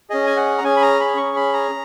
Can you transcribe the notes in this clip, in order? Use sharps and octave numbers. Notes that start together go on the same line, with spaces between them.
C#4 G#4 D#5
G#5
F#5
A#5
C#4 G#4 G#5
B5
A#5
B5
C#4 G#4 C#6
B5
A#5